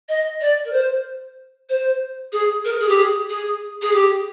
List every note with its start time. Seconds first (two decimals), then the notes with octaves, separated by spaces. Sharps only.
0.08 D#5
0.40 D5
0.65 A#4
0.72 C5
1.69 C5
2.32 G#4
2.64 A#4
2.80 G#4
2.88 G4
2.97 G#4
3.28 G#4
3.81 G#4
3.93 G4